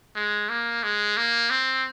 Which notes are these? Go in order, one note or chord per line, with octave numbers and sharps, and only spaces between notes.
G#3
A#3
G#3
A#3
C4